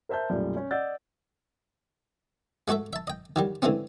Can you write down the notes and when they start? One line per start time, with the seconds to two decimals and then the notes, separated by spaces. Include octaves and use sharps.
0.09 A#4 C5 E5 A5 G6
0.30 B1 F#2 A#2 G3 A3
0.57 C#4
0.71 D5 D#5 F#5 E6 G6 A6
2.68 G#3 A3 F#4 A4 E5
2.93 E5 A5
3.07 D#5 G5
3.36 D#3 F#3 G3
3.62 D3 E3 G#3 A3 C4 C#4